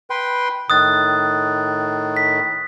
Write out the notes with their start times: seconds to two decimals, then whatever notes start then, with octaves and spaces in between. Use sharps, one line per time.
0.10 B4 G5 C6
0.70 A2 D#3 D#6 F#6 A6
2.17 B6